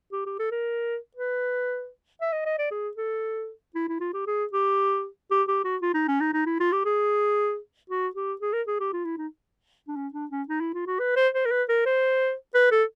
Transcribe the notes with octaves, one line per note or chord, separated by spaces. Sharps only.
G4
G4
A4
A#4
B4
E5
D#5
D#5
D5
G#4
A4
E4
E4
F4
G4
G#4
G4
G4
G4
F#4
F4
D#4
C#4
D#4
D#4
E4
F4
G4
G#4
F#4
G4
G#4
A#4
G#4
G4
F4
E4
D#4
D4
C#4
D4
C#4
D#4
E4
F4
F#4
B4
C5
C5
A#4
B4
A#4
C5
B4
A4